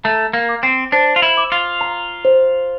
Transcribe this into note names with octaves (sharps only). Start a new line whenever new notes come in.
A3 A#5
A#3
D6
C4
D4 C5
F4
E4
D6
F4
A#5
C5